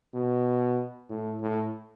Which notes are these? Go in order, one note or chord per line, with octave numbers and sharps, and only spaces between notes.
B2
A2
A2